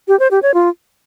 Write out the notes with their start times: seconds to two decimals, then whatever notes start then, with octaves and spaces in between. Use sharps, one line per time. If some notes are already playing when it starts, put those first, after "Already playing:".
0.08 G4
0.20 C5
0.31 G4
0.43 C#5
0.54 F4